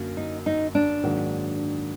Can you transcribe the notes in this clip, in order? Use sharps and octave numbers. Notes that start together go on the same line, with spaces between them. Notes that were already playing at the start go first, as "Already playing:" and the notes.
Already playing: F#2 D3 F#3 A#3
D#4
D#4
D4
G#2 D#3 F#3 A#3